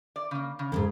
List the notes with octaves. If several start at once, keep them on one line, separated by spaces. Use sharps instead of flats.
D5
C#3 A#3
C#3
D#2 G#2